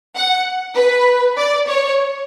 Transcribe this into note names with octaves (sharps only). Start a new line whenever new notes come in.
F#5
B4
D5
C#5